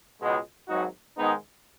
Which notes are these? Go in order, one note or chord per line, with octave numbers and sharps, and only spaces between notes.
C#2 B2 G#3
G#1 G#2 F#3 D#4 F#4
G#2 D#3 G#3 B3 D#4